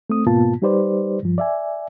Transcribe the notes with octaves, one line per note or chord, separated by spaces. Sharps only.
A3 C4 D#6
G#2 B2 A#3 B3 F4 A5
G3 D#4 G4 B4 C5 D5
G2 F3
D5 E5 G#5